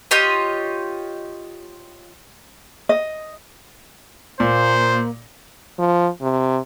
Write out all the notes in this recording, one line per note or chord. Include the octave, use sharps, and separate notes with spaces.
F4 G4 C#5 D#5
D#5
A#2 A#3 C5
F3
C3